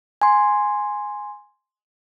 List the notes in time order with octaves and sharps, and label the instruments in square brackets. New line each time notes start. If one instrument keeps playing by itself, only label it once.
[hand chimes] G#5 C6